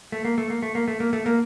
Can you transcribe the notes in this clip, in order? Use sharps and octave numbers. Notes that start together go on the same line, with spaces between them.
A3
A#3
A3
A#3
A3
A#3
A3
A#3
A3
A#3